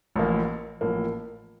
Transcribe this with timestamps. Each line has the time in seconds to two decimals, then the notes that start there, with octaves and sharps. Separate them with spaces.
0.16 A1 A2 F3 A#3
0.81 A1 A2 F3 A#3